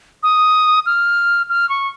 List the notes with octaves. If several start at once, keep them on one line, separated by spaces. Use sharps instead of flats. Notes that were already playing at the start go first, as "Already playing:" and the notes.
D#6
F6
F6
C#6